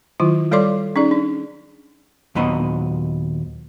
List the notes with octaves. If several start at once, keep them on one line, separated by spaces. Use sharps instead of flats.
D#3 F#3 E4 F4
G3 A4 C#5 D5 C6 D6
C#4 D#4 G#4 D5
D4
D#2 A#2 F#3 B3 D#5 B5